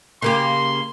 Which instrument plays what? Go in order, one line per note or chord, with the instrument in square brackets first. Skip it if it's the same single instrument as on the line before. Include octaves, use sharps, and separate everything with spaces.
[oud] C#3 A#3 G4 [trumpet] C6